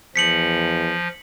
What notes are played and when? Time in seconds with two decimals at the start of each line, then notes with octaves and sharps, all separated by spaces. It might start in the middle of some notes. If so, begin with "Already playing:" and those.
0.16 E2 F3 B6 C#7 F#7